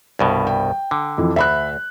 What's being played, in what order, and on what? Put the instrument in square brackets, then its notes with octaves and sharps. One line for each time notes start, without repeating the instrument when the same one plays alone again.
[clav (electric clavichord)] C2 G2 B2
[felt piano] G5
[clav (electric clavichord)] D3
[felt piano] F2 E3
[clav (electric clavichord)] D2 [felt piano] E5 B5 F#6